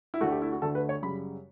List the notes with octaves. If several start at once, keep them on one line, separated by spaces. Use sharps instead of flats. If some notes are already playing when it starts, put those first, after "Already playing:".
E4
D2 D3 A3 F#4
G4
E4
F#4
D2 D3 A3 A4
B4
C#5
F#2 C#3 G3 B5